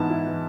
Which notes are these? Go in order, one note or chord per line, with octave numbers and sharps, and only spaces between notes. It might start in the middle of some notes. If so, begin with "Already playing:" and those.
Already playing: G#2 E3 B3 A5
E4
E3